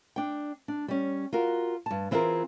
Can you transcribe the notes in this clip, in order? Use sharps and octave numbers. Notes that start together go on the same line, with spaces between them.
D4 G5
D4
G3 C#4
F4 F#4 A#4
G2 A5
E3 C4 E4 F4 G#4 A#4